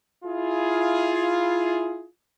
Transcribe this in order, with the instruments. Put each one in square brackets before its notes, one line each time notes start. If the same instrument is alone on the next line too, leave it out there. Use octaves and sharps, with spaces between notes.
[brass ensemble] E4 F4 G#4